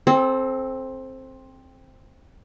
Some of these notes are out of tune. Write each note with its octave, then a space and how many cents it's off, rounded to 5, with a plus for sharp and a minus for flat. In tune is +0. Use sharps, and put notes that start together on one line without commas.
C4 +10 A4 -30